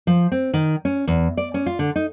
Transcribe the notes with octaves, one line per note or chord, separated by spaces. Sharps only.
F3
C4
D#3
C#4
E2
D5
C#4
F4
D3
D#4